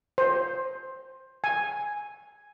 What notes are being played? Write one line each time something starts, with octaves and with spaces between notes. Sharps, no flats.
C5
G#5